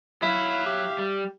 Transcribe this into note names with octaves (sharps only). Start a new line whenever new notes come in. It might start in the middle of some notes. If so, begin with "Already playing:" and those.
F#3 E4 E5 F5
G4
G3